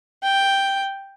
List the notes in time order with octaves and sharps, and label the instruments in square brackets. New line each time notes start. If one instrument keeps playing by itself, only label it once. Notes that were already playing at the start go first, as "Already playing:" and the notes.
[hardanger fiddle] G5